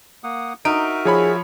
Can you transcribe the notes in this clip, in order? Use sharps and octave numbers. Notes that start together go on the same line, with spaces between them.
A#3 F#5 D#6
D#4 F#4 A#4 E5 D7
F3 G#4 C#5 B5